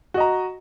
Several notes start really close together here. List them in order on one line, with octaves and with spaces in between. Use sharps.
F#4 D#5 A#5